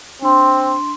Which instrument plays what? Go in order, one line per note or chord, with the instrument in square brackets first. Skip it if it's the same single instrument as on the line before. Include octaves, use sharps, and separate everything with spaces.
[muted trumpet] C4 [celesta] D4 C6